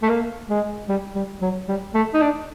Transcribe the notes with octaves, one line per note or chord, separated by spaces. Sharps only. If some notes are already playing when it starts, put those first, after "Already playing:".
A3
A#3
G#3
G3
G3
F#3
G3
A3
D#4
D4